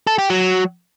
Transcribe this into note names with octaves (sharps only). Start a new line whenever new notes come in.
A4
G4
F#3